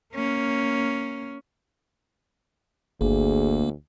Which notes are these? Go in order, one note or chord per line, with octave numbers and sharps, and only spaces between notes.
A#3 C#4
G1 D2 A#3 G#4